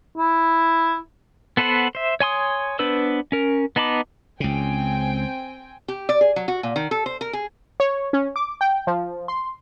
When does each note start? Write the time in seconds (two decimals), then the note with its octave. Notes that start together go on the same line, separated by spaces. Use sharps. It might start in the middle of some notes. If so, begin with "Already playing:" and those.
0.18 E4
1.57 B3 A4 B4 C5 F#5
1.95 C5 E5
2.20 C#5 G#5 C6 D#6
2.79 B3 D4 B4 C5 E6
3.32 C#4 A#4
3.76 B3 D#4 A5 B5 D6
4.40 C#2 C#3 C4 G5 G#5
5.88 G4
6.09 D5
6.21 G#4
6.36 F#3
6.48 F#4
6.63 A#2
6.76 D#3
6.91 A4
7.06 C5
7.21 A#4
7.33 G#4
7.80 C#5
8.13 C#4
8.36 D6
8.61 G5
8.87 F3
9.28 C6